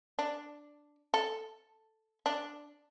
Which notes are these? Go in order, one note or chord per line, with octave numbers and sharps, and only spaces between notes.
D4
A4
D4